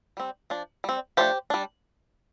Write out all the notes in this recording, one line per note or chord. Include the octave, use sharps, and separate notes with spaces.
G3 C4
F3 D4
G3 C4
F3 A3 D4 G4 C5
G3 D4